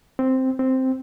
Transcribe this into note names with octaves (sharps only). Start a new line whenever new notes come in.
C4
C4